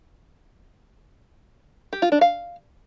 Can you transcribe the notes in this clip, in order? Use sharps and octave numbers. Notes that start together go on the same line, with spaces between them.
G4
F4
D4
F5